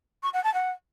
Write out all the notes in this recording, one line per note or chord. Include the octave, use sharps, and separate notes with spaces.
C#6
F#5
A5
F#5